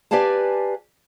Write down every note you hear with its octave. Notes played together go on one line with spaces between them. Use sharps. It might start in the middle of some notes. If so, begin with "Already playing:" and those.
G4 B4 D5 F5 G#5 A5